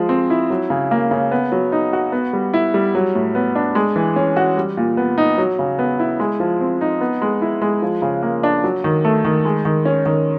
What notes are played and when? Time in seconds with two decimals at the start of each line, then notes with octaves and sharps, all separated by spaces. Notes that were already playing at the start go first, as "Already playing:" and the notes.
Already playing: F3 G#3
0.09 C4
0.30 E4
0.50 F#3
0.70 C#3
0.91 A#3
1.11 C#3
1.31 B3
1.52 F#3
1.72 D#4
1.93 F#4
2.12 B3
2.33 G3
2.54 E4
2.74 G3
2.95 F#3
3.15 A2
3.35 B3
3.55 D4
3.75 G#3
3.96 E3
4.16 C#4
4.37 F#4
4.57 G3
4.77 A#2
4.97 B3
5.18 D#4
5.38 F#3
5.59 C#3
5.79 B3
5.99 E4
6.20 G#3
6.40 F3
6.60 C4
6.81 D#4
7.01 B3
7.22 G#3
7.42 E4
7.62 G#3
7.82 F3
8.02 C#3
8.23 A#3
8.43 D4
8.64 F#3
8.84 D#3
9.05 A3
9.25 D#3
9.45 G#3
9.65 D#3
9.85 C#4
10.06 D#3